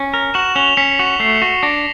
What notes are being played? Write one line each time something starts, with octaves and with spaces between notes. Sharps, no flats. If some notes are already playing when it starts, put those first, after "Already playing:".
Already playing: C#4
A#4
F#4 E7 F#7
C#4 F7 G7
C#4 B6 C#7
F#4
A3 C7
F#4
D4 A#6